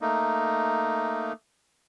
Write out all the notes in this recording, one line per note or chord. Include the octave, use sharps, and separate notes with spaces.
A3 A#3 D#4